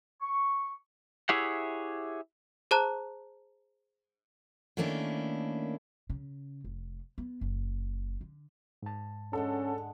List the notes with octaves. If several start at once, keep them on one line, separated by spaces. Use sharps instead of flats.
C#6
E4 G4 G#4 C#5 E5 F#5
G#4 C5 A5 A#5 F#6
D#3 A3 A#3 C#4 D4 E4
C#3
F1
B3
F#1
D3
G#2 A5
D3 G#3 C#4 A4 F#5